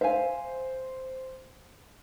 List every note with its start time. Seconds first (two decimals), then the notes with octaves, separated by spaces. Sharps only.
0.01 C5 E5 F5 G#5